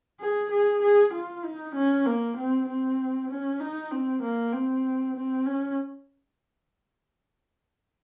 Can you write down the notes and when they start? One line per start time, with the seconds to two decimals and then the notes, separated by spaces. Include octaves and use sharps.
0.20 G#4
0.51 G#4
0.82 G#4
1.14 F4
1.44 D#4
1.75 C#4
2.06 A#3
2.37 C4
2.68 C4
3.30 C#4
3.60 D#4
3.91 C4
4.22 A#3
4.53 C4
5.16 C4
5.46 C#4